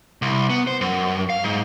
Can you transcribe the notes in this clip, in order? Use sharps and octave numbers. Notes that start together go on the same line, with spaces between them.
C2
B3
C5
F#2
F5
G#2